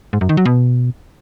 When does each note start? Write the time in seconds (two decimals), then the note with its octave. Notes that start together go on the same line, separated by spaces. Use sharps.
0.13 G#2
0.21 F#2
0.29 D#3
0.37 F#3
0.45 B2